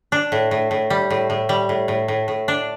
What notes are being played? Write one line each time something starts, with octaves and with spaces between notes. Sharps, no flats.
D4
A2
A2
A2
G3
A2
A2
G3
A2
A2
A2
A2
D4